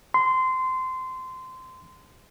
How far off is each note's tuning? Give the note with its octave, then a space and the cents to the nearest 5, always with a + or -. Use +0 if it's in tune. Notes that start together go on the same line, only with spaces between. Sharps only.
C6 -20